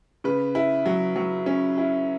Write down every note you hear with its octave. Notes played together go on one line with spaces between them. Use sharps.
C#3 B4
E4
F#3
F#3
C#4
E4